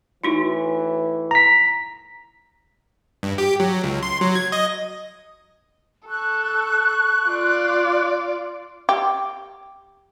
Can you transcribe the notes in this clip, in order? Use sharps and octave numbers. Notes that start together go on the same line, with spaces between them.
A2 E3 D#4 E4 F#4
A#5 B6
G2
G4
F#3
C#2
C6
F#3
G#6
D#5
A4 C#6 F#6
F4 D5
G4